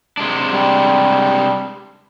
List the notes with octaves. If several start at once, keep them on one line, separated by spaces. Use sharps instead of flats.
C3 G#3 D4
G3